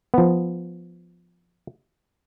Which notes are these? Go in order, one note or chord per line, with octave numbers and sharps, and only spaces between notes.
F3 B3